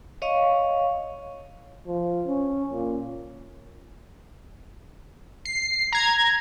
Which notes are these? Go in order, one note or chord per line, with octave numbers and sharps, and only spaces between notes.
C#5 D#5 F5 C#6
F3
C#4
A#2
C7
A#5 G#6